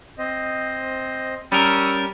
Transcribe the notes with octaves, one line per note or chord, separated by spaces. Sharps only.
C4 C5 D#5
G3 C#4 A#4 C#6 D#6 E6